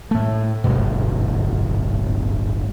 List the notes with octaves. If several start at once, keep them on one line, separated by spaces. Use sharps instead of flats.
A2 A3
D1 G1 G#2 B2